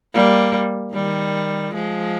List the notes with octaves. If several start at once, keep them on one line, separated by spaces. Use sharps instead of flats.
G3 A#3
D#3 G3
F3 G#3